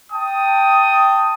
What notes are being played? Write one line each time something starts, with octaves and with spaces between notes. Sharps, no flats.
G5 A5 D#6